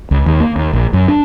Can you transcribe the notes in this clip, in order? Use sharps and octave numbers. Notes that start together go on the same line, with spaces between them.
C#2
D#2
A#3
D#2
A#1
F#2
D4